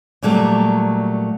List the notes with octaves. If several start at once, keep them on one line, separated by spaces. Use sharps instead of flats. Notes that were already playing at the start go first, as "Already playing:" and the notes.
A#2 F#3 G3 A3 A#3